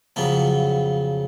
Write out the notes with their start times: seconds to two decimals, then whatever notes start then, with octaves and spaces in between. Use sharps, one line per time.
0.16 F2 C#3 F#3 B3